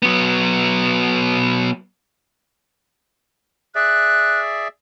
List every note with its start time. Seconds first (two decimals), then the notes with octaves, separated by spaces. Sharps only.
0.03 F#3 B3
3.75 G#4 D5 E5 F#6